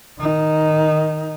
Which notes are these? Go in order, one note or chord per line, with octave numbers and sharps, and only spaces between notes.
D#3 D#4